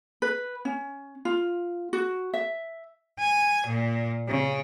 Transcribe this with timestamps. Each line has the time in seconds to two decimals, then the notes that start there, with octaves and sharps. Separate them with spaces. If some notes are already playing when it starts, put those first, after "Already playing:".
0.22 B4
0.65 C#4
1.25 F4
1.93 F#4
2.34 E5
3.19 G#5
3.67 A#2
4.28 C#3